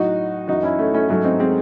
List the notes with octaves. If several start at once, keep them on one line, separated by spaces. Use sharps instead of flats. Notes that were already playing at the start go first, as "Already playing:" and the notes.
Already playing: A2 F#3 D#4 F#4
F#2 E3 D#4 F#4
C#4 E4
A3 C#4
A3 C#4
G#2 F#3 A3 C#4
C4 D#4
G#3 C4